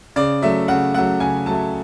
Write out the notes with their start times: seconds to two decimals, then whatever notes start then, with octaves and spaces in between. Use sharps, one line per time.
0.16 C#3 D5
0.42 F#3 A3 E5
0.68 C#3 F#5
0.94 F#3 A3 F#5
1.20 C#3 G#5
1.46 F#3 A3 A5